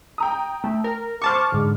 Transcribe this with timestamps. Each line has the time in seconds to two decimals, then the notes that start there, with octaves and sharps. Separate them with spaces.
0.18 G5 A#5 D#6
0.64 A3
0.84 A#4
1.22 C5 A5 C#6 D6 F6
1.52 G#2 D3